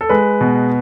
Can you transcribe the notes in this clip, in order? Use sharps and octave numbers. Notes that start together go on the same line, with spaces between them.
A4
G#3 B4
B2